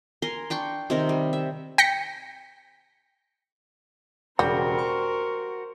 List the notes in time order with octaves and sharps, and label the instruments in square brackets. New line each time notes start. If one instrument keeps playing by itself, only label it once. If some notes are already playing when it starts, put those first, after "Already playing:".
[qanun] A#4 G#5 C6
D4 G5 C6 C#6
C3 D#3 C4 A#4
G3
E5
[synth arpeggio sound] G5 A#6 B6 C#7
[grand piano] E1 C#3 G6 [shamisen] G3 [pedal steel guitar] F#4 [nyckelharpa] A#4 C5
[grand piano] C#6